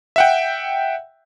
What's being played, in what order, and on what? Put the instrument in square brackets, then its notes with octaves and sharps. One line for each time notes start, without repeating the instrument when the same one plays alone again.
[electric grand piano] E5 F#5 G5